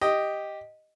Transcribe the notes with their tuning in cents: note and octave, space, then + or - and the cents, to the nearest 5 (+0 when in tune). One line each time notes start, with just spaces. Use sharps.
G4 +0 D#5 +0